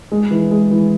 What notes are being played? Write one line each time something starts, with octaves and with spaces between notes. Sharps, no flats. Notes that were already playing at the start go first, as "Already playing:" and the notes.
G#3
E3
G#3
E3